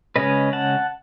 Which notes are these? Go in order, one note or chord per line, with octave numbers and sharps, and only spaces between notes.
C#3 G#3 C#4 B4 D#5
F#5 A5